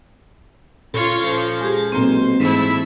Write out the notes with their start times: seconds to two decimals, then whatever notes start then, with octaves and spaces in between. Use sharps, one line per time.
0.94 A#2 C#4 F4 A4 C#5
1.24 F3
1.61 G#3 G4 G#4
1.92 B1 A#3 C4 C5
2.40 G#2 E3 A3 E4